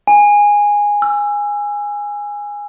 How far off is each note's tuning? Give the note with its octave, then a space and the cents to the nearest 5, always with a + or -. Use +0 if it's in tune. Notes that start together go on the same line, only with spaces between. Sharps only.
G#5 -10
E6 +25